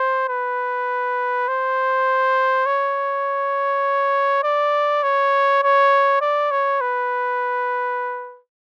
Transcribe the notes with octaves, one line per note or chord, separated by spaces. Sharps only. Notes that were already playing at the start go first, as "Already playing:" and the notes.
Already playing: C5
B4
C5
C#5
D5
C#5
C#5
D5
C#5
B4